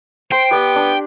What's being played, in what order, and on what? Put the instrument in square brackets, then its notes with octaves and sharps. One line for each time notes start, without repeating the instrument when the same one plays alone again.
[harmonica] C5 [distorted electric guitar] G5 [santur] C6
[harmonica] B3 [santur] G4 D5
[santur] D4